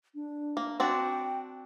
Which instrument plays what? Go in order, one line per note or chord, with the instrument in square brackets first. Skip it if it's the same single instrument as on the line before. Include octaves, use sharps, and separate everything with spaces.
[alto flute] D4
[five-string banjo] A#3
[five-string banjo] C4 D4 F#4 [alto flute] G5